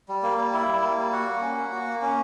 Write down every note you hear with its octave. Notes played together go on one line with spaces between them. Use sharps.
G3
A#3
G3
E4
G3
A#3
G3
F#4 F#5
A#3
C#4
A#3
F#4
A#3
C#4